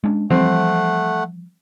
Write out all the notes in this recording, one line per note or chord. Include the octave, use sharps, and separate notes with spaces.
G#3 C#4 D4
E3 F3 G3 A3 C4 F#5